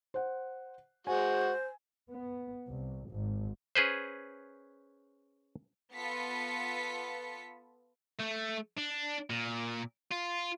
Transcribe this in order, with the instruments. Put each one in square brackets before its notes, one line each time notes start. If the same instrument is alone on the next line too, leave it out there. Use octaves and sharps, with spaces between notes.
[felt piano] C5 F#5
[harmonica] G#3 F#4 [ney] C5 [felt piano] G#5
[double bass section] B3
C2
G#1
[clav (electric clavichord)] C#4 G#4 B4 C5
[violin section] B3 F4 A4 B4 B6 C#7
[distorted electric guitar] A3
D4
A#2
F4